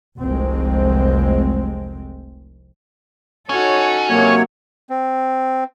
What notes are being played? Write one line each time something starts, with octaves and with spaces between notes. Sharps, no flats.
F1 C2 G#3 C4
C#4 D#4 F#4 A4 C#5
C3 F#3 A#3 C#5
C4